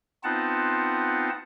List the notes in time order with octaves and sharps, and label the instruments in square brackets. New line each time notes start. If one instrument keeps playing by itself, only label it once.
[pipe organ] B3 C4 D#4 F4 F#5 A5